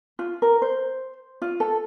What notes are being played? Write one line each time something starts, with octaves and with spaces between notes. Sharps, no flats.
F4
A#4
C5
F4
A4